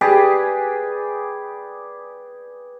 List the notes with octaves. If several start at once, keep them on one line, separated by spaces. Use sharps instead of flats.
G4 G#4 B4 D5